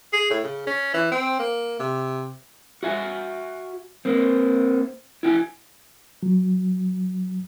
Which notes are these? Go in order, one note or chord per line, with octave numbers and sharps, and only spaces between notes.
G#4
A2
C#3
C#4
E3
C4
A#3
C3
F#4 E5 G#5
A#3 C4
E4 G5 G#5
F#3